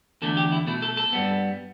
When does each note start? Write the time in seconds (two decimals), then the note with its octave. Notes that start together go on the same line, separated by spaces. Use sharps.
0.22 E2 D3 A3 A4
0.37 G4
0.52 E4
0.67 B2 A3 E4
0.82 A4
0.97 A4
1.13 G2 G3 B3